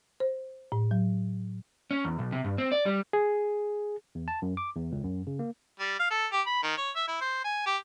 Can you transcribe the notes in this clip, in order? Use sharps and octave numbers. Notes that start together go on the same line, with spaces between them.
C5
A2
F#3
C#4
E2
B1
C3
G2
C4
D5
G3
G#4
E2
A5
F#2
D6
E2
C#2
F#2
C#3
A#3
G3
F5
A4
G4
B5
D#3
C#5
E5
E4
C5
G#5
G4